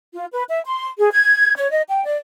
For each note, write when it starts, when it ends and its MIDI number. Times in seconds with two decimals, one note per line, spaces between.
0.14 0.26 65
0.31 0.42 71
0.49 0.61 76
0.65 0.86 84
0.98 1.10 68
1.11 1.54 92
1.55 1.70 73
1.71 1.82 75
1.89 2.03 79
2.05 2.16 74